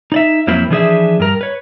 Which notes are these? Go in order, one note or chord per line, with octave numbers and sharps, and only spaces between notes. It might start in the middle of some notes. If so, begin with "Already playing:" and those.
D#4 D5 E5
F2 F#3 A#3 C4 E4
E3 F3 D4 G#4 B4 E5
G2 A#4
B4 C#5